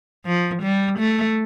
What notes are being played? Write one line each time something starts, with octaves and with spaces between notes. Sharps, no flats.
F3
G3
A3